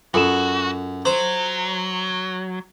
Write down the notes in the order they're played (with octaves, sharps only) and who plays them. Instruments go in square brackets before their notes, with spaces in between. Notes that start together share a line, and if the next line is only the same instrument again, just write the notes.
[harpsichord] F#2 [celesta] F4 A4 E7 [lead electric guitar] F#4
[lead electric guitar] F#3 [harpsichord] C5